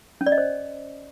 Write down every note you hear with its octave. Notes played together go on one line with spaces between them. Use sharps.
C#4
D5
D#5
C5